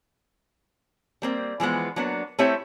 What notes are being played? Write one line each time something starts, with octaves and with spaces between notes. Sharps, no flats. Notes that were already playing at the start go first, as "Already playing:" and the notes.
G3 A#3 C4
E3 F3 G#3 B3
F#3 A#3 B3 D4
A3 C4 E4 G4 C#5 E5